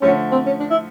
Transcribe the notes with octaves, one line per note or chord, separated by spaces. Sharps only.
D3 F3 A3 C#4
C4
C#4
D4
E4